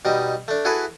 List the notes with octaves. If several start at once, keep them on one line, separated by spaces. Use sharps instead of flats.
B2 G3 D#4
A3 D4
E4 F#4 G#4 A4 B4